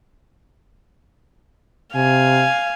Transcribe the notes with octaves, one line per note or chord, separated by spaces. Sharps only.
C3 F5 G#5